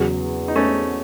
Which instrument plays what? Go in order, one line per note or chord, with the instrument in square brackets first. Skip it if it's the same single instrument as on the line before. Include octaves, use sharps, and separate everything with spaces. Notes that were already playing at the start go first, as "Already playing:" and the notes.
Already playing: [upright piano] E2 C#3 F#3
[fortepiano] D#4
A3 C#4